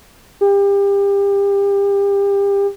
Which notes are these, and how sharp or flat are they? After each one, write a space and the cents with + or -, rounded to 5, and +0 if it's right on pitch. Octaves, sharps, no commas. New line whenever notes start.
G4 +30